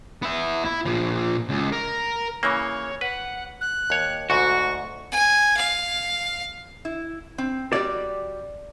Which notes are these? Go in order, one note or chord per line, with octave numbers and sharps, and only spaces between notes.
B3 E5
E4
A#2 F3
C#2
A#4
C#3 E3 A#3 C#5
B4 F#5
F#6
D#2 C#5
D2 G#2 F#4 C#6
G#5
F5
E4
C4
G3 F#4 G4 D5